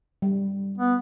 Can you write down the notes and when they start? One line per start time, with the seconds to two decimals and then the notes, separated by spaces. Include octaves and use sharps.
0.22 G3
0.78 B3